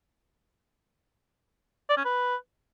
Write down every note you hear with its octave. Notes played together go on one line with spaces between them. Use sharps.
D5
C#4
B4